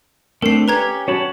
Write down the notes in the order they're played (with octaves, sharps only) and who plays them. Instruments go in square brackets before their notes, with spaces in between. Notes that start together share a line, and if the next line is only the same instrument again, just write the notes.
[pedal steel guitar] A3 C4 D4 [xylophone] A#4 C7
[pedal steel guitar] C#4 G4 [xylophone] B4 A#5 G#6
[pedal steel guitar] C#4 A5 B5 [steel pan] F#4 C#5